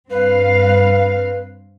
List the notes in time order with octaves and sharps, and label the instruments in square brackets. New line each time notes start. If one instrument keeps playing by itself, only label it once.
[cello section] G2 C4 F5 [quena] B4